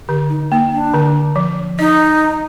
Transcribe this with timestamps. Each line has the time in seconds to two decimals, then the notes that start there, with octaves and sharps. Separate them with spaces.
0.08 D3 G4
0.30 D#4
0.52 A#3 D#4
0.73 D4
0.94 D3
1.36 F3
1.79 D#4 D#5